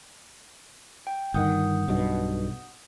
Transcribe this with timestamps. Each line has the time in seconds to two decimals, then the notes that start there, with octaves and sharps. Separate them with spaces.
1.07 G5
1.34 G1 D#3 F#5 D#6 G6
1.88 B1 G2 B2